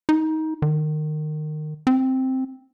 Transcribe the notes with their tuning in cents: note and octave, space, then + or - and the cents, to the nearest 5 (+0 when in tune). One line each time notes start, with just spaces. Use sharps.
D#4 +20
D#3 -25
C4 +0